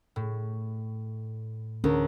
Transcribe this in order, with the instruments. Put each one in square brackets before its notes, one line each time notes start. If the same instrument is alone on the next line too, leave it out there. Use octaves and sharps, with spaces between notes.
[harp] A2
[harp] D2 [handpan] C#4 A#4